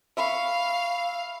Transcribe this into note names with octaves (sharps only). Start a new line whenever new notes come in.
E5 F5 B5 C#6